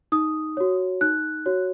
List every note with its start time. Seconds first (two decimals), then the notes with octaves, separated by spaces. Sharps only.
0.12 D#4 D#6
0.57 F#4 C#5
1.01 D#4 F#6
1.46 F#4 C#5